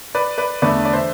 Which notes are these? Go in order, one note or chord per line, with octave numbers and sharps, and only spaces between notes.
B4 D5
B4 D5
E2 D3 A3 B4 D5
D5
C5 E5